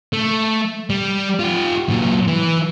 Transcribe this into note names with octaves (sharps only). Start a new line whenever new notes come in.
A3
G3
F4 G4
A#2 F#3
E3